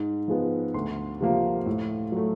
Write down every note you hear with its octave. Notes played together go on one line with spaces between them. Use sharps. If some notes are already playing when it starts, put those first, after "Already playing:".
Already playing: G#2
F3 G#3 B3
D2 C6
C3 F3 A#3
A2
F#3 A3